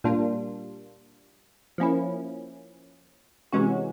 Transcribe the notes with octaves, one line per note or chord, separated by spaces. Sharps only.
A#2 G3 A#3 D4 F4
F3 A#3 C#4 E4
C3 E3 G#3 C#4 F#4